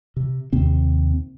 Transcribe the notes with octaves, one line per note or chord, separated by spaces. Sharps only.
C3
D#2 C3 C4